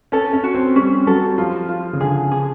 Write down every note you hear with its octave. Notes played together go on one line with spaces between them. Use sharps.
C#4 A4
C#4
F#4
C4
G3 C#4
F#3 A4
F3 F4
F4
C#3
D3 G#4
G#4